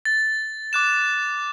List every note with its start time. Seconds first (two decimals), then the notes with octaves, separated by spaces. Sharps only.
0.05 A6
0.73 D6 F#6 E7